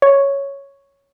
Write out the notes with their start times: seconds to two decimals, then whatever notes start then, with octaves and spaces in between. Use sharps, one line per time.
0.02 C#5